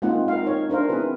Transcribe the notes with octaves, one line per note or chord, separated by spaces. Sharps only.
G#3 A#3 C4 D#4 F4 F#5
A#4 F5
D#4 C#5
D4 A#4 C5 F5
B3 C4 E4 G#4 B4